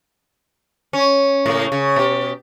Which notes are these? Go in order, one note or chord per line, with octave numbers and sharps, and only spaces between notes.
C#4
A2 C#3 A#3
C#3
B2 G4